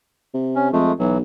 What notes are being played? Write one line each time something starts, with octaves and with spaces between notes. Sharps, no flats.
C3
C#4
F2 G#3 A3
B1 E3 F#3